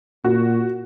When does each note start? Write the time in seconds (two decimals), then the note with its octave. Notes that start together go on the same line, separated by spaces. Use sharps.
0.25 A#2 F#4